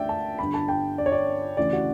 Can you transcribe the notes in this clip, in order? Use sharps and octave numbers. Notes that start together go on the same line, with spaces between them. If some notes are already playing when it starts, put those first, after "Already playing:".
Already playing: D2 D3 D5 E5 G5
A5
G1 G2 D3 B5
A5
G5
D5
C#5
D5
D2 C#3 E3 D5
F#4